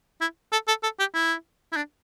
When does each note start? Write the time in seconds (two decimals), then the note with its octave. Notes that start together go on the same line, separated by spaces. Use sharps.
0.21 E4
0.52 A4
0.68 A4
0.83 A4
0.99 G4
1.14 E4
1.72 E4
1.76 D4